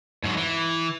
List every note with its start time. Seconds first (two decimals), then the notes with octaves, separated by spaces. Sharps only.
0.24 G#2 F#3
0.37 E3